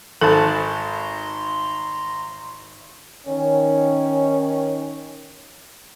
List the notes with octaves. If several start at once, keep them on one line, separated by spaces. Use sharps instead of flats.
G#1 A4 A5 A#5 C6
D#3 C#4